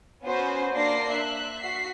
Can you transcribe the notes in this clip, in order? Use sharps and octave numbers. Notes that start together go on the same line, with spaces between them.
B3 C#4 F#4 B4 C5
A#3 D4 D5 C6 A#6 C7
E5 F#6
F#4 B6 C7